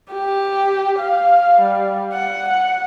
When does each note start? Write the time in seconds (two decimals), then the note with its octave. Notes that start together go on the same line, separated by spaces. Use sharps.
0.12 G4
0.99 F5
1.60 G3
2.13 F#5
2.48 F#5